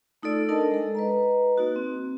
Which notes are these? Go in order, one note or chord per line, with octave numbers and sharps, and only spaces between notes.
A3 D#4 F4 A4 D5 E6
D4 D#4 A4 A#4 D#5 A5
G#3 A4
B4 D#5 A#5
A#3 D#4 F#4
C4